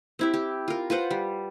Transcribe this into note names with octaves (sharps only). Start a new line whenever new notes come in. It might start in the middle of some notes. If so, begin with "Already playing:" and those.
C4 E4 G4
G4
F4 A#4
F4 B4 C5 F#5
G3